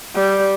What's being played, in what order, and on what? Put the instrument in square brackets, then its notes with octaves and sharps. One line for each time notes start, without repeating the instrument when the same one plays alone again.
[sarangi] G3